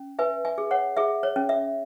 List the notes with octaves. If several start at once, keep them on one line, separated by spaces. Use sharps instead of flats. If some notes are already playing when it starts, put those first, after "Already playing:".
Already playing: C#4
B4 E5 G#5
E5 G#5
G#4
C#5 F#5
G#4 E5
C#5
C#4
E5